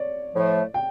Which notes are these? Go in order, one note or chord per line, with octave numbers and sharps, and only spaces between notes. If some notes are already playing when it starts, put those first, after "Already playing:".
Already playing: C#5 D5
A2 F3 A3
G5